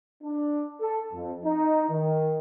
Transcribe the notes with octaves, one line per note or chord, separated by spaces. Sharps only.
D4
A4
F2
D#4
D#3